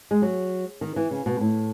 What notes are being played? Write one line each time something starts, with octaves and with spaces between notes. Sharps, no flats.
G#3
F#3
D#3
E3
C#3
B2
A2